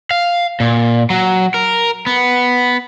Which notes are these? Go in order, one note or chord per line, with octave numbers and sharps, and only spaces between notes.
F5
A#2
F#3
A#4
B3